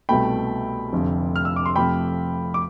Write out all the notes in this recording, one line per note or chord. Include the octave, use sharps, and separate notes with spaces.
C2 B2 A3 G5 B5
F1 F2 D3
F6
E6
D6
C6
F2 C3 F3 A3 G5 B5
D6